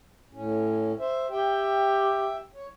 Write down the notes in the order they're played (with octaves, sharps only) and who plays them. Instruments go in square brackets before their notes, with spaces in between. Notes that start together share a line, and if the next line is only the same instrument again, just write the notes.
[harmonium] A2 C#4
C5 E5
[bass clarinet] G4 [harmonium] E5 G5
[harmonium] C#5